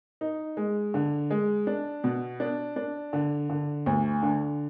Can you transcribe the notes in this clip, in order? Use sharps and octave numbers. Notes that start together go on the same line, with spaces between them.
D#4
G#3
D3
G#3
D4
B2
D4
D4
D3
D3
D2
D3